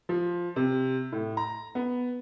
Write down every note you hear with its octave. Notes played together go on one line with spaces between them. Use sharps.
F3
C3
A2
A#5
B3